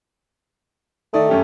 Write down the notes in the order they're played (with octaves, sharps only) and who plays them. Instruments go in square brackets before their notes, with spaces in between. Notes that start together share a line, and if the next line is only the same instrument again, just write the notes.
[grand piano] D#3 D5 D#6 [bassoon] A3
[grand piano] F#2 C#4 G4